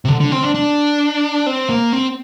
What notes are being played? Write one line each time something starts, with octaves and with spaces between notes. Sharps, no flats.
C3
D3
D3
C4
D4
D4
C4
A#3
C4